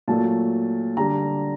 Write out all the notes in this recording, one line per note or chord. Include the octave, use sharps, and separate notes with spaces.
A#2 F#3 A3 A5
D3 G3 A#5